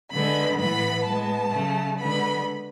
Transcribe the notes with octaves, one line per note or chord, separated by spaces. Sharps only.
D3 G#3 B3 B5
A2 E3 B3 B5
A2 G#3 B3 A5
C#3 F#3 A3
D3 G#3 B3 B5